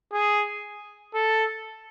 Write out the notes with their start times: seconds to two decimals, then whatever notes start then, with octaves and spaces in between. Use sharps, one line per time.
0.13 G#4
1.14 A4